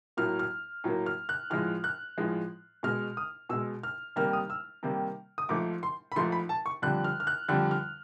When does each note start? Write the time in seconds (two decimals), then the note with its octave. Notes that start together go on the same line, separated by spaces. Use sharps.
0.17 A2 F#3 A#3 F6
0.39 F6
0.84 A2 F#3 A#3
1.06 F6
1.29 F#6
1.50 A2 F3 G#3 F6
1.84 F#6
2.18 A2 F3 G#3
2.83 B2 G#3 F6
3.17 D#6
3.49 B2 G#3 E6
3.83 F6
4.16 C3 D#3 G3 A#3 F6
4.33 D#6
4.50 E6
4.83 C3 D#3 G3 A#3
5.38 D#6
5.49 G#2 F3 A3 D6
5.83 C6
6.12 B5
6.16 G#2 F3 A3 C6
6.32 B5
6.49 A5
6.66 C#6
6.82 F2 D3 G3 F#6
7.04 F6
7.20 F6
7.27 F#6
7.48 F2 D3 G3 F#6
7.71 F6